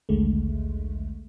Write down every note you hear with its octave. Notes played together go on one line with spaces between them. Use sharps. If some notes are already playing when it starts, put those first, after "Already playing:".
A#1 D#2 D3 G#3 A3